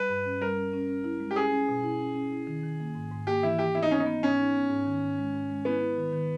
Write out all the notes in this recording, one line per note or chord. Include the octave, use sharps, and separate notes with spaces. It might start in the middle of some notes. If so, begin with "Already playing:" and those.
Already playing: G3 B4
G2
C#4
G3 A#4
C#4
C#4
C#4
E4
G#3
G4
C#4 G#4
C#4
B2
E4
C#4
C#4
E4
D#3
D#3
A#3
G#2
G#2
A#3 G4
E3 E4
E3 G4
B3 E4
D#4
B3 C#4
D#4
B3
G#2 C#4
D#4
B3
G#2
D#3
G#2
G#3
G#2
G#3
B3 E4
E4
D#3
D#3